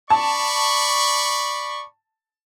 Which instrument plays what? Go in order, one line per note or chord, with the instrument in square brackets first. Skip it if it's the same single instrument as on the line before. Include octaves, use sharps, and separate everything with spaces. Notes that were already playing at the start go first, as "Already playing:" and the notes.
[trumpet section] D5 B5 C#6 [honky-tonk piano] A5